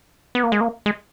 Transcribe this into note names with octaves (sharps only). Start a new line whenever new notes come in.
B3
A#3
G#3
A#3
G#3